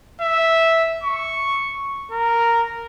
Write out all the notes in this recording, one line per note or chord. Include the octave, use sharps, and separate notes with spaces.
E5
C#6
A#4